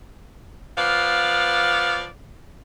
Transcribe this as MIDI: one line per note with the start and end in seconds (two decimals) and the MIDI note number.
0.78 2.07 53
0.78 2.07 59
0.78 2.07 74
0.78 2.07 77